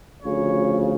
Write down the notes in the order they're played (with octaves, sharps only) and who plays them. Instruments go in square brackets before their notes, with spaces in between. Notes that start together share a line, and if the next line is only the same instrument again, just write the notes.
[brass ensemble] D2 C#3 F3 C#5